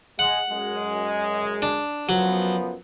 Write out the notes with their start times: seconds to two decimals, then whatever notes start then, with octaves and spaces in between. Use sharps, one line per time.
0.19 G#3 F#5
0.50 F#2 G#3
1.62 D4
2.09 F#2 F3 F#3 B3